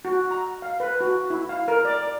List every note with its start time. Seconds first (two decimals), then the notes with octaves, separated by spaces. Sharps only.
0.05 F#4
0.31 A#5
0.62 F5
0.80 B4
1.01 F#4
1.30 E4
1.49 F5
1.68 A#4
1.85 D5